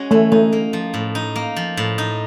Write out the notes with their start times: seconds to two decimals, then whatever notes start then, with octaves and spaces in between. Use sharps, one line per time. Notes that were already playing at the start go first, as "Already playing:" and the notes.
Already playing: G#3 C#4 F#4
0.11 E3 A3
0.32 A3 D#4
0.53 A#3
0.73 F3
0.94 A2
1.15 D#4
1.36 A#3
1.56 F3
1.77 A2
1.98 D#4